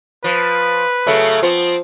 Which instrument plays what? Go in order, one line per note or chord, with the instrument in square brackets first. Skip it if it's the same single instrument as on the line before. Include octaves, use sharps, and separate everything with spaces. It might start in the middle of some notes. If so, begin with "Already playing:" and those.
[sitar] F3 [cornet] B4
[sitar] C#3 F#3 B3 [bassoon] A3
[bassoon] F3 [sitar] B3 C4